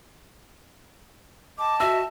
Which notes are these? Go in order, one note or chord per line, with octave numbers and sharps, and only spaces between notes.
D#5 G5 A5 D6
F#4 E5 E6